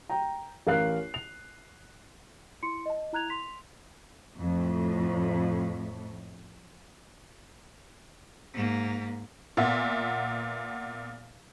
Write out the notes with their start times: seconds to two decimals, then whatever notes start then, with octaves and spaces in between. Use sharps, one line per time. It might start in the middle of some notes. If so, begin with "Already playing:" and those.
0.10 G5 A#5
0.67 A1 A#4 F5 F#6 C7
1.14 F7
2.63 E4 C6 C#7
2.86 D#5 A5
3.13 E4 A#5 F#6 G#6 F7
3.30 C6 B6 F7
4.40 F2 A2
8.54 G#2 A#3
9.57 A#2 B3 E5